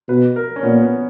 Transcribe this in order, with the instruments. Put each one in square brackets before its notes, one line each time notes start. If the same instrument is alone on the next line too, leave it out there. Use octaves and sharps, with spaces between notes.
[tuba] B2 [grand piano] B4
[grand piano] A#4
C#4
[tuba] A#2 [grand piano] B3
[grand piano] B3